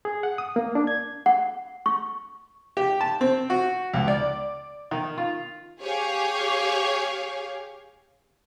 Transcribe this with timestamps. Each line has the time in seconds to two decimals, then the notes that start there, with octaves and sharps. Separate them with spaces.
0.05 G#4
0.23 F#5
0.38 D#6
0.56 A#3
0.75 D4
0.87 G#6
1.26 F#5
1.86 C#6
2.77 G4
3.01 A5
3.21 C4
3.50 F#4
3.93 C#2
4.08 D5
4.91 D#3
5.18 F4
5.82 G4 G#4 C#5 F5